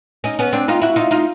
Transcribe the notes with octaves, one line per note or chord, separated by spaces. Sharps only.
C#4 D#4
B3 C#4
C4 D4
D#4 F4
E4 F#4
D#4 F4
D#4 F4